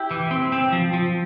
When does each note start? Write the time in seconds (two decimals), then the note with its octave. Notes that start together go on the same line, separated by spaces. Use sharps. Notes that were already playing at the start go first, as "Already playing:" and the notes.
Already playing: E4 G4
0.11 E3
0.31 C4
0.52 C4
0.72 F3
0.93 F3